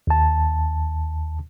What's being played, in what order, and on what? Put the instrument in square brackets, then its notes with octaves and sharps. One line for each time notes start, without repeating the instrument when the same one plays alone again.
[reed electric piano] D#2 A5